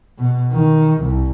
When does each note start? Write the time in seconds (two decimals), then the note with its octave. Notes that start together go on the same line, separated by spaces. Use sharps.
0.19 B2
0.52 D#3
1.01 C2